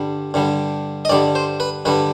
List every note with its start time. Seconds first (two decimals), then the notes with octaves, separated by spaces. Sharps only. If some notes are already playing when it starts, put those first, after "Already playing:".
Already playing: G2 D3 G3
0.34 G2 D3 G3
1.05 D#5
1.09 G2 D3 G3 D5
1.35 C5
1.60 B4
1.85 G2 D3 G3 B4